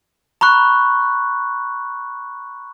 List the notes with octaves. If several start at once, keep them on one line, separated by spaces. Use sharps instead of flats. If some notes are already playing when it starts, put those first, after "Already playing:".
A#5 B5 C#6 F#6